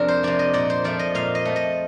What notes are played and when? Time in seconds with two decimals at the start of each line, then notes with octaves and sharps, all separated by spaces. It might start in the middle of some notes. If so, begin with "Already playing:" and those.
Already playing: F2 C3 D4 A#4
0.08 C5
0.23 C3 F3 D5
0.39 D#5
0.53 A#2 D5
0.70 C5
0.84 F3 A3 D5
0.99 D#5
1.15 A#2 F5
1.35 D#5
1.45 F3 A3
1.56 D#5